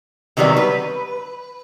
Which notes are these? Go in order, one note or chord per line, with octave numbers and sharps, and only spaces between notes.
C3 D#3 F#3 G3 B3
B4